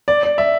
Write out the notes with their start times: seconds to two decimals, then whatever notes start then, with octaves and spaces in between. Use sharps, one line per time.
0.08 D5
0.23 D5
0.38 E5